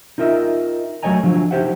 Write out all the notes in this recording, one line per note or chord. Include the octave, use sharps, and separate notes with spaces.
D#4 F4 A#4 D#5 E5
F#3 A3 C#5 D#5 G#5 A#5
D3 F3 F#3
D#4 E4 G4 C5 E5 F#5